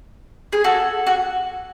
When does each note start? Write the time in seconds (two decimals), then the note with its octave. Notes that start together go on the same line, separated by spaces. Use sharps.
0.52 G#4
0.64 F#4 A4
1.07 F#4